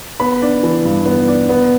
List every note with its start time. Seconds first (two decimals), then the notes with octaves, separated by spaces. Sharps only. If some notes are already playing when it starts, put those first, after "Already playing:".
0.20 B3 B5
0.42 D4
0.63 E3
0.85 G2
1.06 B3
1.28 D4
1.49 B3